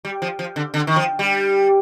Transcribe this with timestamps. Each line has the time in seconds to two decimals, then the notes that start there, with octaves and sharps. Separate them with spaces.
0.05 G3
0.22 F3
0.39 F3
0.56 D3
0.74 D3
0.87 D#3
0.96 F3
1.19 G3